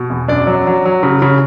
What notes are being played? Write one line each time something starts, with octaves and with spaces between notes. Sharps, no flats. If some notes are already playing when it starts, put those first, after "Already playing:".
Already playing: B2
E2
F#2 D4 D5
F#3
F#3
F#3
C#3
C#3